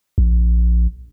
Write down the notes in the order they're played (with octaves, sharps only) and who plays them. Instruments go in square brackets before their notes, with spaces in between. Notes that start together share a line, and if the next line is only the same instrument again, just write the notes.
[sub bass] A#1